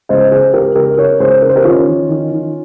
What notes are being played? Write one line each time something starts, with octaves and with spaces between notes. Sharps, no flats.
C#2 C5 D#5
C#3 G#4 C5
C#2 G4 A#4
C#2 G4 A#4
C#3 A#4 C#5
C#2 G#4 C5
C#3 A#4
C5
G4 A#4
D#3 C#4 F4
D#3
D#3
D#3